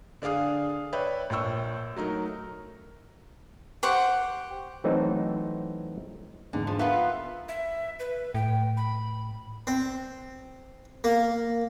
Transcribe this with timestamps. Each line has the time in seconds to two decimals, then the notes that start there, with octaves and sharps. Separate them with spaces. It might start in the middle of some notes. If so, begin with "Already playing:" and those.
0.22 D3 D4 G#4 F5 D#6
0.93 B4 C#5 D5 E5 G5
1.30 A#1 C#5 G5 C#6 E6
1.96 F#3 A3 D#4 A#4
3.83 G4 C5 F#5 C#6
4.84 E3 F#3 A3 C4 D#4 C5
6.53 E2 G#2 D3
6.67 F3
6.79 B3 F4 A#4 B4 E5
7.48 E5
7.99 B4
8.34 A2 G5
8.77 B5
9.67 C4
11.04 A#3